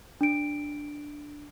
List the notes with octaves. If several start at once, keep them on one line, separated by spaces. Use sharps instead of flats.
D4 D7